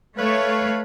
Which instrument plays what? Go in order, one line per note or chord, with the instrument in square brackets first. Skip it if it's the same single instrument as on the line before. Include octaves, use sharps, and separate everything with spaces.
[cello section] A3 C#5 [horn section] B4 F5